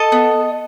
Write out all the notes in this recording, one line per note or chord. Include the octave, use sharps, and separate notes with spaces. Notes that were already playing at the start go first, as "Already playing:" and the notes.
Already playing: A4 D#5
B3